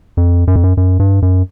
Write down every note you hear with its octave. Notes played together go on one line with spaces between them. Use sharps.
F2
F#2
F2
F#2
F#2
G2
F#2